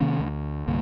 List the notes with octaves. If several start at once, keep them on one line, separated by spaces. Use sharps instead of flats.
C3 D#3 A#3 C#4
D2
C2 G2 D3 A#3